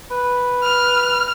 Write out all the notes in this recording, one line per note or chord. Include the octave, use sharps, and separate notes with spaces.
B4
F6